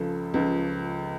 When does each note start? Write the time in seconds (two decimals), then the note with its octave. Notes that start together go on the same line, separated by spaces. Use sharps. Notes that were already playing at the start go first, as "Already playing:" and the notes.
Already playing: C#2 C#3 F3 A4
0.34 C#2 C#3 F3